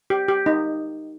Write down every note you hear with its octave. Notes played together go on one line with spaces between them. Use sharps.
G4
G4
D#4